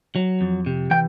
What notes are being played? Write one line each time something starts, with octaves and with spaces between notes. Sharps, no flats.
F#3
F2
C3
E3 G5